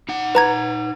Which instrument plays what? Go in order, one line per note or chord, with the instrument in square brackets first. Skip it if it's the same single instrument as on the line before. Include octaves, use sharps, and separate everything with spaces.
[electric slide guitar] D#4 F#5
[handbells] B4 A#5 G#6